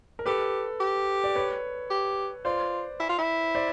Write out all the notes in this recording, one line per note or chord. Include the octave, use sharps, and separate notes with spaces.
A#4
G4 A4 B4
G4
D5
B4 C#5
G4
F4 C5 D5
E4
F4
E4
C5 D5